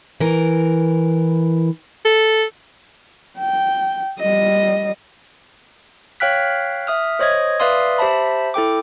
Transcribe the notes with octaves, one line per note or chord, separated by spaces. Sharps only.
E3 A#4
A4
G5
G3 D#5
C#5 F5 G5 F6 F#6 B6
E5 D#6 F6
C5 C#5 D#5 D#6 G#6
B4 D5 E5 F5 C6 D#6
G4 C5 E5 A5 B5
E4 A4 G5 D6